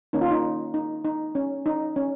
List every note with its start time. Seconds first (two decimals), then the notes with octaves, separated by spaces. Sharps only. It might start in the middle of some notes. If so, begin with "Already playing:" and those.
0.13 D#3 A#3 C#4 D#4
0.21 F4
0.31 D#4
0.74 D#4
1.05 D#4
1.35 C#4
1.66 D#4
1.96 C#4